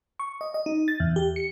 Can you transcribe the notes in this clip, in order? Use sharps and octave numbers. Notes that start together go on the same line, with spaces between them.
C#6
D#5
D#5
D#4
A6
E2
G4
C#7